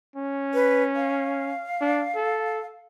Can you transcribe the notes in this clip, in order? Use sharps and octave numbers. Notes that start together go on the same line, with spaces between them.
C#4
B4
F5
D4
A4